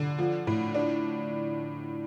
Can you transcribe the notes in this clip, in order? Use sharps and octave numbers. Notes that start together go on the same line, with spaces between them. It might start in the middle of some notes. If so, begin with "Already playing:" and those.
Already playing: D3
F3
A2
D4